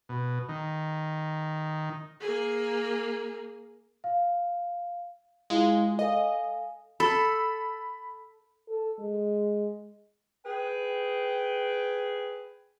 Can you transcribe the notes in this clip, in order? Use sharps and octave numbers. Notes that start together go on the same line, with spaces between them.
B2
D#3
A#3 G#4
F5
G#3 E4 F4 F5
A4 D#5 F5 G#5
A4 B5
A4
G#3
G#4 B4 G5